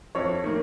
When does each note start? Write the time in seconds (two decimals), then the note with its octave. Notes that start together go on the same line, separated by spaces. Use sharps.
0.15 F2 C#5
0.44 D#3 A#3